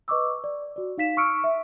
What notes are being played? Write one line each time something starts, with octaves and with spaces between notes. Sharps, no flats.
B4 D#5 C#6 D6 E6
D5
F#4 D5
D#4 F5 B6 E7
C#6 E6 F6 C#7 D7
E5